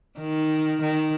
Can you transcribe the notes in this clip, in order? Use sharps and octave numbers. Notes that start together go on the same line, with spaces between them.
D#3
D#3